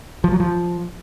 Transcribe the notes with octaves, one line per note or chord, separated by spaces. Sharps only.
F3
F#3
F3